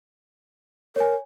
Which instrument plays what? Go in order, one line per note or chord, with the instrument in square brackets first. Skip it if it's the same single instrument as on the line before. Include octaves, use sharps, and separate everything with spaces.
[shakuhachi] A#4 [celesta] C#5 G#5